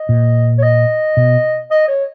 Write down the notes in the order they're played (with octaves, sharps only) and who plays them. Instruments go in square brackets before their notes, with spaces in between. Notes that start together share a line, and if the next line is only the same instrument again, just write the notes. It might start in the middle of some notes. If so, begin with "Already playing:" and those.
Already playing: [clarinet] D#5
[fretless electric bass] A#2
[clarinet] C#5
D#5
[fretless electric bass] B2
[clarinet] D#5
C#5